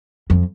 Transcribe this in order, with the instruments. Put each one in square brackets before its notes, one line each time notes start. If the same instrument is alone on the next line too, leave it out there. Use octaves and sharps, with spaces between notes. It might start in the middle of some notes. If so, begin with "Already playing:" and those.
[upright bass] F2